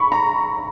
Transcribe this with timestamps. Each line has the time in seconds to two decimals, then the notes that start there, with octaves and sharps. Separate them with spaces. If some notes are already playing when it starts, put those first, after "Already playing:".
Already playing: B5 C#6
0.12 A#5